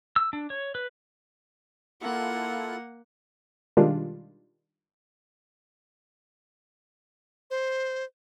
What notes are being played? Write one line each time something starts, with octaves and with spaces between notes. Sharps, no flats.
E6
D4
C#5
B4
A#3 E4 F4 A4 F#5
B2 D#3 G3 G#3 D4 F4
C5